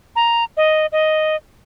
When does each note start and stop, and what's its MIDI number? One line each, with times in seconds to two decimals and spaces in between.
0.16 0.44 82
0.57 0.86 75
0.92 1.36 75